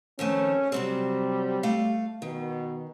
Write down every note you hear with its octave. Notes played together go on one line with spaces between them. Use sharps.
F2 D#3 A3 C#4
C3 F#3 G3 C4
A3 F5
B2 D#3